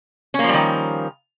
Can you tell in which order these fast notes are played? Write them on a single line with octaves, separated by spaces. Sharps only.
C#4 A#3 F3 G3 D#3